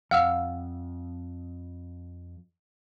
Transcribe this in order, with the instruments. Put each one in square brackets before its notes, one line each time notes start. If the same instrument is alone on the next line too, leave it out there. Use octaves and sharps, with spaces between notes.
[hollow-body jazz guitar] F2 [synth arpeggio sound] F5 [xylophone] F#5 E6 F6